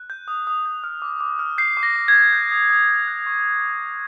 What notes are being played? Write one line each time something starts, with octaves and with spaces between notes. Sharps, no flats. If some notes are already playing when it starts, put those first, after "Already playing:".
Already playing: F#6
G6
D#6
D#6
G6
F6
D6
D6
F6
G6 C7
D6
A#6
D6
G#6
G6
G6
D#6
D#6
G6
F#6
C#6